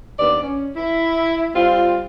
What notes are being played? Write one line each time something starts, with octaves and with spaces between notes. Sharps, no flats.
D#2 B3 D4 D5
C#4
E4
G3 C4 F4